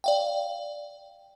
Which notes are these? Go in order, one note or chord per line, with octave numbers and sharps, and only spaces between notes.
D5 F5 G5